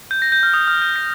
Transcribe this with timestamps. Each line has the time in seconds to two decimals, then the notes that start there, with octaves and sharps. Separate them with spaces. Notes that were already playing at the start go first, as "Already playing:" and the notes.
0.11 G6
0.22 A#6
0.32 G6
0.43 F6
0.54 D#6
0.68 F6
0.82 G6
0.96 A#6